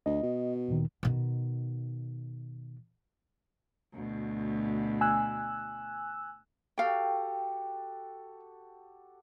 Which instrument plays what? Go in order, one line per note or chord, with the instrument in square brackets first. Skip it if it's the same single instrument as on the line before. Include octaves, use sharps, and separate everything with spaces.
[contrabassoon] D2 [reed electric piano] D#5
[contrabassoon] B2
[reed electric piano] D2 A#2 D#3
[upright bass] B2 D#3
[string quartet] D2 B2
[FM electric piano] G#5 E6 F#6
[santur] F#4 G4 A4 [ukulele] F5 G5